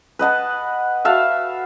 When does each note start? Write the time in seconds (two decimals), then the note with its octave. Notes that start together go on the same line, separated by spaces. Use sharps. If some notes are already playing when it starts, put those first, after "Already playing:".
0.19 B4 D#5 F#5 A5
1.05 F#4 E5 F5 A5